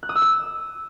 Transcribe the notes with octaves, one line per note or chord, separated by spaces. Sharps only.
F#6
D#6
E6
D#6